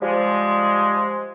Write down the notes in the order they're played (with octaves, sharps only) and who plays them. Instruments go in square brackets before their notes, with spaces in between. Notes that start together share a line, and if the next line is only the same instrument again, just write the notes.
[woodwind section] F3 G3 G#3